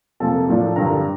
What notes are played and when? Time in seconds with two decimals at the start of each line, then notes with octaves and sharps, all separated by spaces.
0.20 F2 C3 F3 A#3 A4 A5
0.48 A2 F3 A#3 D4
0.76 G2 D3 G3 A#4 A#5